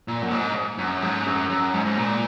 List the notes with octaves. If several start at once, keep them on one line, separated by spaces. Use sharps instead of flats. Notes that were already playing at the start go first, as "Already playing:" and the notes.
A#2
F#2
G#2
F#2
G#2
F#2
F#2
G#2
G#2
A#2